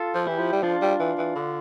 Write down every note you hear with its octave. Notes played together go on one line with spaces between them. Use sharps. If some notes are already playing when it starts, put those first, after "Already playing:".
Already playing: F4 A4
F3
E3 E4 G4
F3
G3
F3 D4 F4
G3
E3
E3
D3